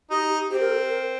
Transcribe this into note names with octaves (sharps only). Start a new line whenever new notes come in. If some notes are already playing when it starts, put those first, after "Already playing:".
D#4 G4
G4
C4 G4
A#4
A4
A#4